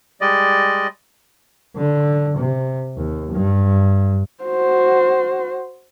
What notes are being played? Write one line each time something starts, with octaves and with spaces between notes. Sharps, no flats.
G3 G#3 D5 D#5
D3
C3
D#2
G2
F#4 C5